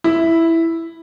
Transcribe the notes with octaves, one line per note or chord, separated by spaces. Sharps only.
E4